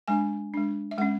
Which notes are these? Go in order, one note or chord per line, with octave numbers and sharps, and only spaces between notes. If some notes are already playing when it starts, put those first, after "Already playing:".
G#3 D4 G#5
G#3 D4
E5
G#3 C#4 F#5